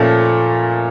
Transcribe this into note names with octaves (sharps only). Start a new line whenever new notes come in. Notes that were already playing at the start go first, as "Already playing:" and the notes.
Already playing: A#2 F3 A3 C#4